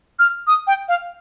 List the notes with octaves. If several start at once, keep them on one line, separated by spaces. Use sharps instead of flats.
F6
D#6
G5
F5